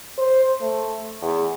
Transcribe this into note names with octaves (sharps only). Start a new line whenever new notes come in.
C5
A3
E2